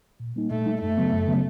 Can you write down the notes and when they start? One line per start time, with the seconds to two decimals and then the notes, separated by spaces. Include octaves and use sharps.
0.20 A#2
0.36 G3 A#3 D#4
0.50 A#2 A3
0.66 G3 A#3 D#4
0.81 F#2 A3
0.98 C#3 F#3 B3
1.12 F#2
1.28 C#3 F#3 B3